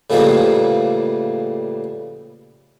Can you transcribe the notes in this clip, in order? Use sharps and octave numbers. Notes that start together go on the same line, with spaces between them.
A2 C#3 E3 F3 G3 A#3